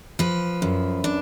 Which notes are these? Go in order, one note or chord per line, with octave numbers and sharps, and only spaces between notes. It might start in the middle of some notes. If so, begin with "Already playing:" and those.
F3 B4
F#2
D4